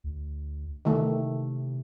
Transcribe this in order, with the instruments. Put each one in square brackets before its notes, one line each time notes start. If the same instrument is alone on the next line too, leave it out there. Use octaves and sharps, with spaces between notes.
[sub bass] D2
[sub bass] C3 [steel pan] D#3 A3